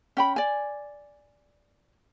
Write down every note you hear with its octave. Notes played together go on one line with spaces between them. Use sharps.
C#4 G5 B5
D5 G#5